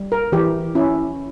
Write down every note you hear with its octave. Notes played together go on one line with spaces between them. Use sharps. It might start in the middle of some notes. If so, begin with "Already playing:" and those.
Already playing: G3
A#4
E3 G4
C#4 E4